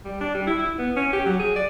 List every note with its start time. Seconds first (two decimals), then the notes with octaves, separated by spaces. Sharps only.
0.05 G3
0.21 D4
0.34 G3
0.47 E4
0.59 E4
0.78 B3
0.96 C#4
1.13 G4
1.26 F#3
1.39 G#4
1.56 D5